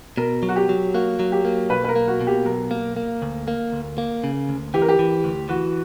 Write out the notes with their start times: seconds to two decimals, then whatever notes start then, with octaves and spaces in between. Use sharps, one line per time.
0.17 B2 A#4
0.43 F#3
0.49 F#4
0.56 G4
0.69 F#3
0.94 A#3 F#4
1.20 F#3
1.32 G4
1.45 A#3
1.70 B1 B4
1.84 B4
1.89 A#4
1.96 A#3
2.08 F#4
2.21 B2
2.27 G4
2.45 B1 A#4
2.71 A#3
2.97 A#3
3.22 D2
3.48 A#3
3.72 D2
3.98 A#3
4.24 C#3
4.49 D2
4.74 E3 G4
4.82 A#4
4.88 G4
4.99 E3
5.24 D2
5.49 E3 F#4